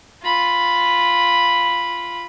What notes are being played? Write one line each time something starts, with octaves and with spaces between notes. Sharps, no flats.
F4 B5